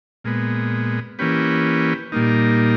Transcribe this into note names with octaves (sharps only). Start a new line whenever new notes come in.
A#2 G#3 B3
E3 A#3 C#4 G4 B4
A#2 G3 A#3 D#4